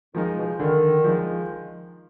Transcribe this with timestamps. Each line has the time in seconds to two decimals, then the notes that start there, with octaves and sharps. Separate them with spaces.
0.14 D#3 F3 G#3 D#4
0.37 B2
0.59 D3 D#3
1.04 F3 G#3 D#4